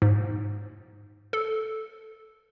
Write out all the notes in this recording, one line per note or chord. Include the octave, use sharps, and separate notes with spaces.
G#2
A4